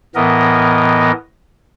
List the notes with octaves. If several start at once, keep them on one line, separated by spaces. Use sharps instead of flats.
A2 E3 B3 A#4 D#5